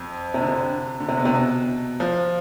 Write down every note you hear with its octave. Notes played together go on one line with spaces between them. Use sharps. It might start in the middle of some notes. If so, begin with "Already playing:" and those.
Already playing: F2
C3
D3
C3
D3
C3
B2
C3
B2
F3